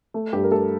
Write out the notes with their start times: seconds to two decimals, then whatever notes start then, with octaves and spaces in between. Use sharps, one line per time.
0.14 A3
0.32 G2 G4
0.44 A#4
0.51 A3 A4